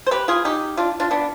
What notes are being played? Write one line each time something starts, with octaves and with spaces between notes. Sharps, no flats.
C5
G4 B4
F4 G#4
D#4 G4
D4 F4
D4 F4
B3 D4